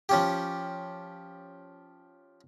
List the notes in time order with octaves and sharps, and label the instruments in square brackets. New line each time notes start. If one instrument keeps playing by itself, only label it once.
[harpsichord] F3 C#4 G4